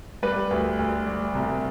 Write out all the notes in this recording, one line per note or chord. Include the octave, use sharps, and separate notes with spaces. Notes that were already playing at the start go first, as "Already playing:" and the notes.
G3 B4
D2
D2
G3
C2